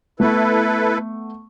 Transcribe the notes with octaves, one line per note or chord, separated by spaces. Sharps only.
A3 B3 E4 A4 B4